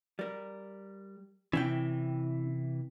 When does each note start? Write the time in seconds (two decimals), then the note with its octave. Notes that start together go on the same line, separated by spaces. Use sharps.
0.19 G3 A#4
1.53 C3 E3 C#4 E4 G5